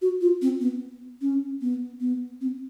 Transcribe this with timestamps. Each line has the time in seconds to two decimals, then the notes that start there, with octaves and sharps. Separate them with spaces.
0.02 F#4
0.21 F4
0.42 C4
0.61 B3
1.22 C#4
1.62 B3
2.00 B3
2.41 C4